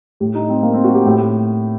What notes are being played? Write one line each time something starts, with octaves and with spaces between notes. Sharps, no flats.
A2 G4
D#4
C4
A#3
C4
F#4
G4
A2